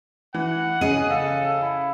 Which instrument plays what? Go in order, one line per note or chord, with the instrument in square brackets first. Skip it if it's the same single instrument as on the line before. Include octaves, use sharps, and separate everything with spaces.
[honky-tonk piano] E3 [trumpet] F#5
[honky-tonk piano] C#3 D#7 [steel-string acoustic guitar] G#4 D#5
[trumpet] A4 [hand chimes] F5
[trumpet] E4